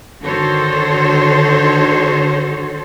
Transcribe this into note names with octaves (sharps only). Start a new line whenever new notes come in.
D3 D#3 F#4 A4 C5 C#5